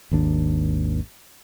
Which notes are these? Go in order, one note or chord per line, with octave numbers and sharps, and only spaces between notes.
G#1 D#2 D4